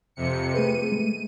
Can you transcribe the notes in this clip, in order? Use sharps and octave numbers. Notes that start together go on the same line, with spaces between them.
F2 C3 C#7
A3 G#4 B4 D#7
G#3 A3